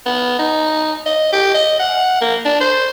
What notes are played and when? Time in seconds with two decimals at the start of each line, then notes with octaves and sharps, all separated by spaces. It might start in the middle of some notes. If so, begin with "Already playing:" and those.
0.06 B3
0.39 D#4
1.06 D#5
1.33 G4
1.54 D#5
1.79 F#5
2.21 A#3
2.45 D4
2.60 C5